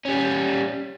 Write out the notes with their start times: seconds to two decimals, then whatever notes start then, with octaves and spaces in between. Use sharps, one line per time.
0.05 G3 C#4